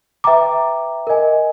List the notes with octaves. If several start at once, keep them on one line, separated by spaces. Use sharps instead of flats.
B4 E5 G5 A#5 D6
A#4 D#5 G#5